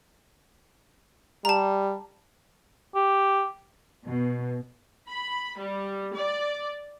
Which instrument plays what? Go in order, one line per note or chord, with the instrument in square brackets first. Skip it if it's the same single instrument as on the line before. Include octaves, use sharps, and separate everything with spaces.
[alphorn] G3 [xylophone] A5 A#5
[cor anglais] G4
[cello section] B2
[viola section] B5
G3
D5